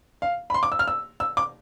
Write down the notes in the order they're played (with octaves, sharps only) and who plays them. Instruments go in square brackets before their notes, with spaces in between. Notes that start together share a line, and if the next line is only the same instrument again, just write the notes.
[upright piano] F5
B5
C6
D6
E6
F6
E6
E6
D6